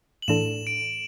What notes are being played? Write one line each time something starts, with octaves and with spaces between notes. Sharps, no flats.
F#7
A2 E3 D4 A4 E7
D7